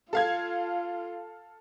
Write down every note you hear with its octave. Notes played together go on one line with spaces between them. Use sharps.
F4 A4 F5 G#6